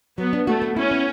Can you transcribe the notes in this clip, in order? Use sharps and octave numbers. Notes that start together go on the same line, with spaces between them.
F#3 B3
D4
A3 F#4
B3
C#4 E4
B3